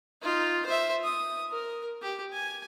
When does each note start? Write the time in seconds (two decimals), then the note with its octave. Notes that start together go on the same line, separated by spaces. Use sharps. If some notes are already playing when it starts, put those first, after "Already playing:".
0.22 D#4 F4
0.66 C5 E5
1.04 D#6
1.51 A#4
2.02 G4
2.33 G#5